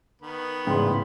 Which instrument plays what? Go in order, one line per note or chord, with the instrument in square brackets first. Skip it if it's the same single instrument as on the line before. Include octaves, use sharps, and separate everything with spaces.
[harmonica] D#3 B3 B4
[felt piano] A1 G#2 C#3 [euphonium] E2 [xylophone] G5 C6